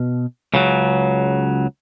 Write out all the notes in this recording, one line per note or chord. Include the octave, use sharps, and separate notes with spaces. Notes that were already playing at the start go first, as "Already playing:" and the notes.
Already playing: B2
C#2 C#3 F#3